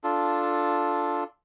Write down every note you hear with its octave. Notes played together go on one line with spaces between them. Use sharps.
D4 F4 A4